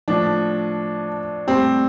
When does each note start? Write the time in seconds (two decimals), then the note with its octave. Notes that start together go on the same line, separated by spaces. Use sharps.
0.08 A2 F3 D4
1.47 A2 G3 C4